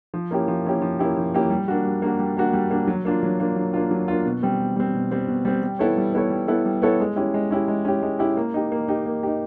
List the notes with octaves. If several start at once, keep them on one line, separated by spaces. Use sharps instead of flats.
F3
A#3 C#4 E4 G4
F3
A#3 C#4 E4 G4
F3
A#3 C#4 E4 G4
F3
A#3 C#4 E4 G4
G3
A#3 D4 F#4
G3
A#3 D4 F#4
G3
A#3 D4 F#4
G3
A#3 D4 F#4
F#3
A#3 D4 F4
F#3
A#3 D4 F4
F#3
A#3 D4 F4
F#3
A#3 D4 F4
B2
G3 C4
B2
G3 C4
B2
G3 C4
B2
G3 C4
G3
B3 E4 A4 C#5
G3
B3 E4 A4 C#5
G3
B3 E4 A4 C#5
G3
B3 E4 A4 C#5
G#3
C#4 E4 G4
G#3
C#4 E4 G4
G#3
C#4 E4 G4
G#3
C#4 E4 G4
A#3
D#4 G4
A#3
D#4 G4
A#3
D#4 G4